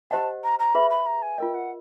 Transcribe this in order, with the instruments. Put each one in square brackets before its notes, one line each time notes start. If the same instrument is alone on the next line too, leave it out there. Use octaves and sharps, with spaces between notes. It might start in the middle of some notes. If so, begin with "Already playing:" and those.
[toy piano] G4 C5 D#5 F#5 [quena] A5
[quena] A#5
A#5
[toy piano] G#4 B4 E5 [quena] B5
[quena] B5
A#5
G#5
[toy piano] F4 A#4 D#5 [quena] G5
[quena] F#5